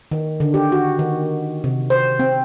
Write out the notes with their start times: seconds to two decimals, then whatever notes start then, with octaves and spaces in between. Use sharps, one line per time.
0.12 D#3
0.40 D3
0.54 G4
0.72 F#4
0.99 D#3
1.64 C3
1.90 C5
2.19 C4